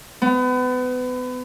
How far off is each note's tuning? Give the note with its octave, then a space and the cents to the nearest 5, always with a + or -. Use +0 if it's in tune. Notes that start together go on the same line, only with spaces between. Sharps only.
B3 +30